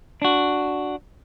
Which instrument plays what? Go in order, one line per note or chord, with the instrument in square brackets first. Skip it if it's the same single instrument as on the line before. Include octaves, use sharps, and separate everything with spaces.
[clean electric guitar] D4 F#4